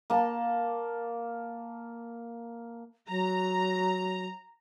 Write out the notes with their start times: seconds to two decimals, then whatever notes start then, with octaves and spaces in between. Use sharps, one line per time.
0.10 A#3 A5
3.09 F#3 A#5